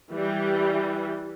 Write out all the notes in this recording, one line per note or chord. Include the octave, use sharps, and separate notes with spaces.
E3 G3